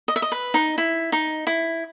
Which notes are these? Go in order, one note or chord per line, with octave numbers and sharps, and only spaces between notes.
D#5
E5
D#5
B4
D#4
E4
D#4
E4